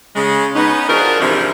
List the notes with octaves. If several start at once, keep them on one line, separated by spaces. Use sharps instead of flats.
C#3 G#3
B3 C#4 D#4
F3 D4 F#4 G#4 A#4
G#2 C3 E3 F3 D4 E4